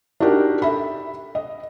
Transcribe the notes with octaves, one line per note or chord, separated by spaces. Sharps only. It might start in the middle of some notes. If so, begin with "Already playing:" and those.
D4 D#4 F#4 G4 A#4
A4 E5 B5
D#5